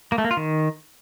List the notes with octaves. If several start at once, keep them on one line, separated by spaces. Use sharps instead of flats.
A#3
A3
A#3
F4
D#3